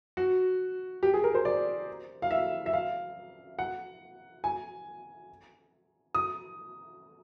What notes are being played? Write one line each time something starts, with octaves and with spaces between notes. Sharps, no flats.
F#4
G4
G#4
A#4
C5
D5
F5
E5
E5
F5
F#5
G#5
D#6